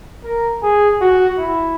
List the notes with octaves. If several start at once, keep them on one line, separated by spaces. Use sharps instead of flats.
A#4
G#4
F#4
E4